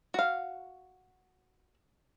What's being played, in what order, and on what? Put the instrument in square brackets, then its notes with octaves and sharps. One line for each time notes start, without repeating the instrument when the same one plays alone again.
[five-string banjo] F#4 F5